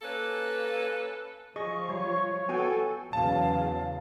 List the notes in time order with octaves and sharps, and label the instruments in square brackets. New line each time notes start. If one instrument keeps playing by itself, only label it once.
[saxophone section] A#3 C#4 A4 B4
[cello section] F3 F4 [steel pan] G#4 D#5 [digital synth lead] C#6
[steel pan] G3 [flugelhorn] C#5
[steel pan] B3 F#4 G5 [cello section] A4 [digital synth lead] G#5
[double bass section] E2 C#3 F#3 [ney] F5 [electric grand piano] A5